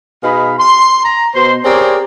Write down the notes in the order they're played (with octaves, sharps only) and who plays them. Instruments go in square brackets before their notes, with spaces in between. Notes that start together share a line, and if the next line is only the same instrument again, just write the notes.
[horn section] B2 D#4 G#4 F5 B5
C6
A#5
B2 C5 C6
C4 G4 G#4 A#4 C#5 D5